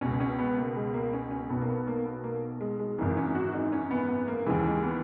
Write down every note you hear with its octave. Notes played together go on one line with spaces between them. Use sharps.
C#2 B2 C#4
C#4
B3
A#3
G#3
A#3
C#4
C#4
B1 B2 B3
A#3
B3
A#3
B3
A#3
G#3
G#3
G#1 F#2 C#3 E3 A#3
C#4
F#4
D#4
C#4
B3
B3
A#3
D#2 C#3 E3 G#3
G#3
B3